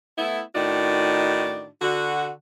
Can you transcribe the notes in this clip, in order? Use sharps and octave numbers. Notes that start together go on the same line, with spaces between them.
A3 B3 E4
A2 D#3 D4 D#4 F#4
D3 F#4